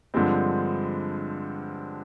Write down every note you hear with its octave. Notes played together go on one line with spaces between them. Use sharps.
G2 D3 F3 G#3 C4